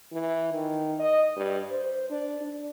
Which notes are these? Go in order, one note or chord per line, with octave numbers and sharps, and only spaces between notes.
E3
D#3
D#5
G2
C5
D4
D4